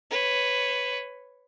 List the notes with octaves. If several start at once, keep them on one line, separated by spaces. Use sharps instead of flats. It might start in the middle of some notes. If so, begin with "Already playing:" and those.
B4 C#5